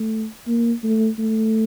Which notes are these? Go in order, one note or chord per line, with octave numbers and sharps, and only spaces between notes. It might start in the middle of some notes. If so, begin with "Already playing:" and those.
Already playing: A3
A#3
A3
A3